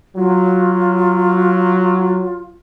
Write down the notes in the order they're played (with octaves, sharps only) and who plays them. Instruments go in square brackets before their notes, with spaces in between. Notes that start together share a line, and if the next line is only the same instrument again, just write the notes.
[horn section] F#3 [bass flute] F4